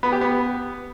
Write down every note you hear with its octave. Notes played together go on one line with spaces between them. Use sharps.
B3
G4
B3